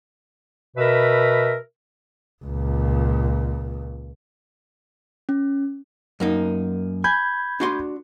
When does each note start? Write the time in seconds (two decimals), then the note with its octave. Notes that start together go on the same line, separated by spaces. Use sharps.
0.77 B2 A#4 B4 E5
2.45 C#2 A#2
5.29 C#4
6.20 F#2 A#3 D#4
7.04 G#5 B5 G6 G#6
7.60 D4 F#4 C6